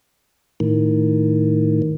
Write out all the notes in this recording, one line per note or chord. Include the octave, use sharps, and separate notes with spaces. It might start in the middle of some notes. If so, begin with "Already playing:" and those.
A2 D#3